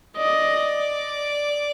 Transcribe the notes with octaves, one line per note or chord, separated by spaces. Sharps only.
D5 D#5